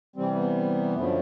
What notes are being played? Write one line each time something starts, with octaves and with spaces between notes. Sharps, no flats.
C3 E3 G3 C4
B3
F#2 D3 F3 A3